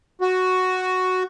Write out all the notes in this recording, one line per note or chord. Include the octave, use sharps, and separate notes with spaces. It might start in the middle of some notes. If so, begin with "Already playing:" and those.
F#4